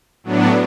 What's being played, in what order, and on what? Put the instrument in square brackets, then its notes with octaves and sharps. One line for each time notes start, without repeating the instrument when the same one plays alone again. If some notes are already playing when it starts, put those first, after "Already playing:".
[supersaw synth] A2 F#3 B3 D4